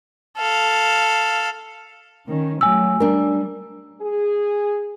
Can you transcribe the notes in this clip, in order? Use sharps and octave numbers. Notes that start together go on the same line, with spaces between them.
A4 F5
D#3 C#4
F#3 A3 G#5 E6
G3 D4 A#4
G#4